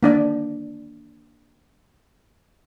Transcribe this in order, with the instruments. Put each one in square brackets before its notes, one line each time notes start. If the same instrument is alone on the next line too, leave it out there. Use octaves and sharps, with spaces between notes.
[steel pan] A#3 D4 D5